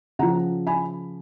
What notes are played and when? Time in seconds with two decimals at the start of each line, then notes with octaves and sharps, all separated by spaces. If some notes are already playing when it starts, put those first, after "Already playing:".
0.19 C#3 F3 F#5 A#5
0.67 G#5 B5